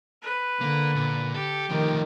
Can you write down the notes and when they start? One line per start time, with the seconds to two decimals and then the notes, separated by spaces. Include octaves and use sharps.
0.22 B4
0.61 D3 A#3
0.95 A#2
1.35 G4 A4
1.70 D#3 F3 A3